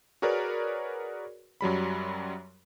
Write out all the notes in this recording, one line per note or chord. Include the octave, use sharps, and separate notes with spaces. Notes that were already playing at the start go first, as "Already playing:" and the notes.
F#4 G#4 A#4 B4 C#5 D5
F#2 F#3 G3 B5